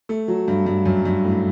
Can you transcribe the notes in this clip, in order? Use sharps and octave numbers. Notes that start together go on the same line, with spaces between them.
A3
F#3
G2
G2
F#2
G2
A2